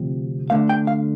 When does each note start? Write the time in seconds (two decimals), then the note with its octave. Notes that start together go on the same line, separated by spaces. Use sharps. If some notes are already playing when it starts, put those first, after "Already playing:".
Already playing: D2 C3 F3
0.50 D2 D3 A3 F5
0.69 G5
0.87 F5